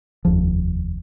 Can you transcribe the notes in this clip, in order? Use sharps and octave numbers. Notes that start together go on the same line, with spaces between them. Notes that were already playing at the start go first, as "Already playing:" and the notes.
F1 D#2 F3